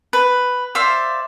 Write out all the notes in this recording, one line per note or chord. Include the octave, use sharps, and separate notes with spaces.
B4
C5 D5 E5 F5